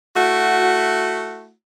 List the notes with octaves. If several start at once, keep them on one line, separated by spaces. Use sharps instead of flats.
A3 E4 F#4